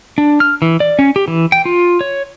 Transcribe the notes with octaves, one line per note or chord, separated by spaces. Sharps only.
D4
F6
E3
D5
C#4
G4
E3
G5
F4
C#5